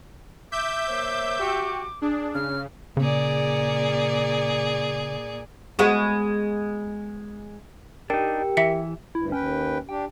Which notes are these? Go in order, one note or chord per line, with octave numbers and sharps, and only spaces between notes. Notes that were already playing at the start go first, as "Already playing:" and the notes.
E5 D6 G6
A#3 C5 C#5
F#4 G4
D4 G#4
C#3 F6
A#2 C#3 G#4 D5
G#3 B3 F#4
D4 D#4 G4 A#4 G5
E3 E5 B6 C#7
D2 G2 E4
D#2 C#4 B4 G5
D4 G4 G5